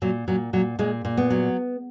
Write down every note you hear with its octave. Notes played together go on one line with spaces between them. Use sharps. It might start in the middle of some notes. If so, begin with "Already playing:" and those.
A#2 F#3
A#2 F#3
A#2 F#3
A#2 G#3
A#2
B3
F#3